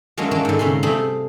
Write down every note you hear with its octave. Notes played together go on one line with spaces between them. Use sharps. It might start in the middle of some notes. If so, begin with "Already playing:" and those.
F#3 G#3 A#3 C#4 D4 E4
G#3 A#3 C#4 D4
G#2 D3
C3 C4 C#4 B5 C6
G3 A3 C4 F4 G#4